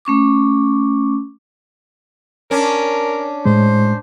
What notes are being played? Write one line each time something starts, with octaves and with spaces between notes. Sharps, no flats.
A3 C#4 C#6 D6
C#4 D4 A#4
A2 G#3 C5